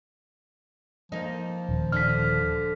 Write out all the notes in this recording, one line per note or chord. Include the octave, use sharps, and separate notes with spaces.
F3 A#3 D#4
D#1
D3 F6 B6